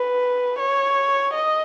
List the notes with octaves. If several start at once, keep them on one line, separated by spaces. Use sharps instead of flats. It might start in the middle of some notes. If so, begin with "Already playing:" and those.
Already playing: B4
C#5
D#5